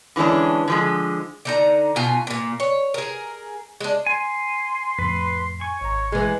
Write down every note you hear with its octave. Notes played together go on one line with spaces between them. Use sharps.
D3 E3 G#3 C#4 D4
D3 F3 G#3
D3 D#4 A#5
B2 D#4 F4 G#5
A#2 A#3
C#5
G#4 A#4
G#3 D4
G#5 C6
F2 A2 B4
G#5 C#6
G#1 C#5 A#5
E3 G#3 G#5